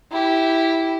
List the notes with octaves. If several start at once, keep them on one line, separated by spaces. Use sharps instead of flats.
E4 G4